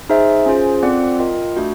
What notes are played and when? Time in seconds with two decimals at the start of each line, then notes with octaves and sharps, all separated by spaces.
0.10 D#4 G#4 C5 E5
0.46 C#4 F4 G#4 C5
0.82 C4 F4 A4 D5 F#5
1.19 F4 A#4 D#5 G5
1.56 A3 D4 F#4